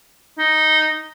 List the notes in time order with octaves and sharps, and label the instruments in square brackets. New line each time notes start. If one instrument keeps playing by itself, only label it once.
[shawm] D#4